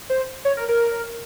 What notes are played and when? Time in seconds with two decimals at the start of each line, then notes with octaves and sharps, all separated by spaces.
0.10 C5
0.45 C#5
0.57 A#4
0.68 A#4